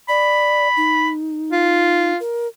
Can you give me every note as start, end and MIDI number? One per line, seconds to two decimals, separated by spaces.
0.09 0.68 74
0.09 1.10 83
0.77 2.13 63
1.52 2.18 65
2.20 2.47 70